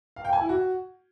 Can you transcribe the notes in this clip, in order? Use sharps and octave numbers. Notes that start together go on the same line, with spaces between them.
F5
G5
G#5
E4
F#4